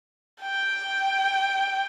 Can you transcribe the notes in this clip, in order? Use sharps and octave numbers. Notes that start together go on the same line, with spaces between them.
G5